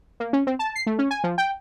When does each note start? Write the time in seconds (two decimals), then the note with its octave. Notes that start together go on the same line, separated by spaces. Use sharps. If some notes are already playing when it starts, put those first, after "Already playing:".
0.20 A#3
0.33 C#4
0.47 C4
0.59 A5
0.75 C7
0.87 A3
0.99 C#4
1.11 G#5
1.24 F3
1.38 G5